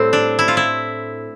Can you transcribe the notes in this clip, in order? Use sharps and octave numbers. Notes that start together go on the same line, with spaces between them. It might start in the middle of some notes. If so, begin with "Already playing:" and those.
Already playing: A2 G3 A3 C4
D4
E4
F4
E4